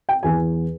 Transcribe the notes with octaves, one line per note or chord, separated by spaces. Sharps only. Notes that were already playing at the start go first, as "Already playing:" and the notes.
G5
E2 E3 G#5